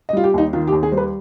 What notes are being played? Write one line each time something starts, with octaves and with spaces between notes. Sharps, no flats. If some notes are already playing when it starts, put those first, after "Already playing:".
D#5
G3 F4
G4
D#2 D#4
D#3 F4
G4
D#2
G#4
G3 C5
B4